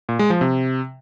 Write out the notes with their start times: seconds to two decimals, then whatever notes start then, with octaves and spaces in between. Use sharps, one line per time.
0.09 A#2
0.19 G#3
0.30 F3
0.41 C3